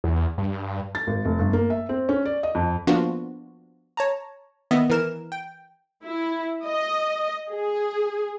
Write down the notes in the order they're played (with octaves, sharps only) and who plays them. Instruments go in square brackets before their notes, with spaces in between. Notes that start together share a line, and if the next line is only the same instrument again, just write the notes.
[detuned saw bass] E2
G2
[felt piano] A6
G#1
F1
G1
A#3
E5
C4
C#4
D5
D#5
F2
[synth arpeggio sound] F3 A#3 B3 D4 F4 F#4
C#5 A5 A#5
D#3 B3 D#5 E5
E3 A#4 E7
G5
[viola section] E4
D#5
G#4